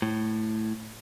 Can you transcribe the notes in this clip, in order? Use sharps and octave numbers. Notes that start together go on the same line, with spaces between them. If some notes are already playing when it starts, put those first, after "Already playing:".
A2